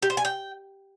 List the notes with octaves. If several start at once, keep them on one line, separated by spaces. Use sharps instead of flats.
G4
C5
G#5
G5